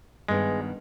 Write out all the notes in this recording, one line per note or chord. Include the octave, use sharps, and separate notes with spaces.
G2 D#3 G#3 B3